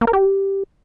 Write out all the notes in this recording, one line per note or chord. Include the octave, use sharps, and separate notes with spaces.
A#3
A#4
G4